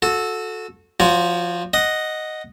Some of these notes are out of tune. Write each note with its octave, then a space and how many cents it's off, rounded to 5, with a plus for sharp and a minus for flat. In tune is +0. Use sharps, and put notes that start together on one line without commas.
F#4 -25 A4 -10
F3 +0 F#4 -20 C#5 +40
D#5 +0 F#5 -5